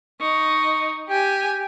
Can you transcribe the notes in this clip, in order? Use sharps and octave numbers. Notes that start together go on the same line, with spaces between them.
D#4 C#6
G4 G5 G#5